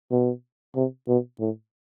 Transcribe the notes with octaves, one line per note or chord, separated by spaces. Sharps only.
B2
C3
B2
A2